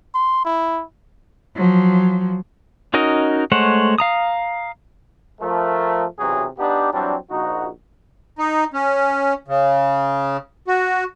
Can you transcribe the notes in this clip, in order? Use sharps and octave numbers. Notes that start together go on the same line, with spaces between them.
C6
E4
F3 F#3
C#4 D#4 F#4 A#4 D#5
G#3 A3 C5 C#5 F#5
F5 A#5 D#6
F3 A3 A#4
B1 C3 E3 F#3 F#4 G#4
B3 D4 D#4 G4
E3 F#3 G3 C4 D4
A#1 D#4 F#4
D#4
C#4
C#3
F#4